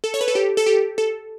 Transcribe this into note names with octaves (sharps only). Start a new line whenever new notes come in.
A4
C#5
B4
A4
G4
A4
G4
A4